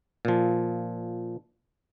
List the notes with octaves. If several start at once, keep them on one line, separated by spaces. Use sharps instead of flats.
A#2 F3